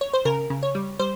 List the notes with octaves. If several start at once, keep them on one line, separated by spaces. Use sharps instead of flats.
C#5
C5
C#3 A#4
C#3
C#5
G3
G3 C5